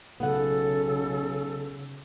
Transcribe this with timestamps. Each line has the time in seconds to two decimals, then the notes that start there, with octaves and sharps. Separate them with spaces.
0.20 B1 C#3 B3 A4 F#5